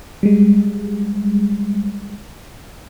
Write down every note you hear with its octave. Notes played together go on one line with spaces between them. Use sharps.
G3 G#3